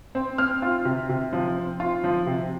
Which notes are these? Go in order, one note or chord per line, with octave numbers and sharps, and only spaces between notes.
C4
C4 F6
F4
C3
C3
F3
C4
F4
F3
C3